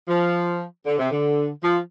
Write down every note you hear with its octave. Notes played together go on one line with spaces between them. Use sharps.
F3
D3
C3
D3
F3